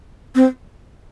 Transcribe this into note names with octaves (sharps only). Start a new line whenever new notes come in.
C4